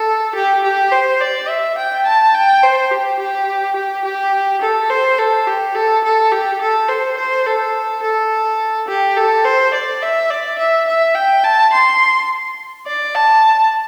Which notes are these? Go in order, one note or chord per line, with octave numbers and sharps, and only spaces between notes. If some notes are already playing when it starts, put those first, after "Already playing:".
Already playing: A4
G4
G4
C5
D5
E5
G5
A5
G5
C5
G4
G4
G4
G4
A4
C5
A4
G4
A4
A4
G4
A4
C5
C5
A4
A4
G4
A4
C5
D5
E5
D5
E5
E5
G5
A5
C6
D5
A5